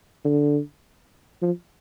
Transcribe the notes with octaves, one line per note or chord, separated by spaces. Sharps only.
D3
F3